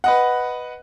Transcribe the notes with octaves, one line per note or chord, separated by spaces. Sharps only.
B4 D#5 F#5